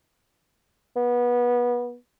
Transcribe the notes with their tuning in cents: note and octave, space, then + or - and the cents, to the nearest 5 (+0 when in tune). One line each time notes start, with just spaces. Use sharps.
B3 -25